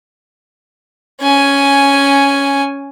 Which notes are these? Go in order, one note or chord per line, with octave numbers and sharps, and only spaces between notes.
C#4 G#5